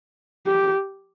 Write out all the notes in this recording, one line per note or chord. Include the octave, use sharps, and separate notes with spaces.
G4